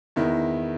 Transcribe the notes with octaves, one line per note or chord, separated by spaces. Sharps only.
E2 D#3 E4